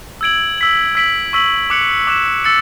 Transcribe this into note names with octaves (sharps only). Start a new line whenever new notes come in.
E6 G#6 D7 F#7
E6 B6 F#7
E6 B6 D7 F#7
C#6 E6 B6 F#7
D6 F#6 C#7 F#7
D6 F#6 B6 E7
E6 A6 C#7